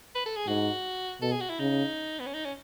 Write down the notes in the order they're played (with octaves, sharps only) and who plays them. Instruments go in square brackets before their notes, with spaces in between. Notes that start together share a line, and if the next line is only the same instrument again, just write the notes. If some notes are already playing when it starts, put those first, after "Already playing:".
[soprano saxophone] B4
A4
G#4
[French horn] G#2 [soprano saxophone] F#4
[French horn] B2 [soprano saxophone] A4
[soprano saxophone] G#4
F#4
E4
[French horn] C#3 [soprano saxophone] D#4
[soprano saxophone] B3
C#4
D#4
C#4